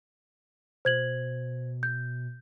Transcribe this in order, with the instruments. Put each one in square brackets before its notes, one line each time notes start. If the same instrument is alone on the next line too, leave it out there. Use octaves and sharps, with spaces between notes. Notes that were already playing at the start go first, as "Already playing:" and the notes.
[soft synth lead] B2 [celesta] C5 G#6 F#7
[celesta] G6